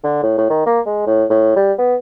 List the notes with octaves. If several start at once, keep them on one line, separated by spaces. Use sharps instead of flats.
D3
A2
A2
D#3
A#3
G#3
A2
A2
G3
B3